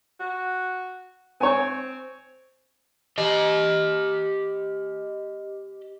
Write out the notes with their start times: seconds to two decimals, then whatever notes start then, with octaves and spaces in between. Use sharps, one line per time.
0.20 F#4
1.41 C4 C#5 G#5
3.18 G4 D#5